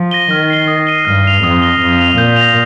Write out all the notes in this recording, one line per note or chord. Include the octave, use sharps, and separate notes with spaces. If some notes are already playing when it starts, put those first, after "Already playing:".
Already playing: F3
A#6 D#7 G7
D#3 F6
C7 G7
D#6
C7 D#7 G7
G2 F6
C7 F7
F2 D#6
A#6 G7
F2 A#6
F7
A#2 G6
A#6 F7